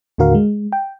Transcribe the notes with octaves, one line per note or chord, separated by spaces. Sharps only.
D#2 A2 D3 F#4 A#4 F5
G#3
G5